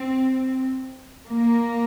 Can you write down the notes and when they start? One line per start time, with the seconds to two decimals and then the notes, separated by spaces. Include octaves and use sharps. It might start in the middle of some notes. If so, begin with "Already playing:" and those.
Already playing: C4
1.28 A#3